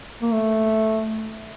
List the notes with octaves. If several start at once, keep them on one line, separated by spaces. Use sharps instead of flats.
A#3
A3